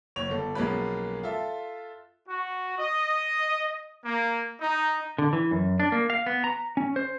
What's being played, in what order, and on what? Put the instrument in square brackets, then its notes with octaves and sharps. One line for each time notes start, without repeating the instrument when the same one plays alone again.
[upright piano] F#1 C#5 F7
G1 A4
B1 F3 G#3 A#3 C#4 B4
F4 A4 E5
[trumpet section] F#4
D#5
A#3
D#4
[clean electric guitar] D3
E3
F#2
D4
A#3
F5
B3
A#5
C#4
C5